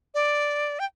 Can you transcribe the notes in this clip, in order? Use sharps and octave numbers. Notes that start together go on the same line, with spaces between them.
D5
G5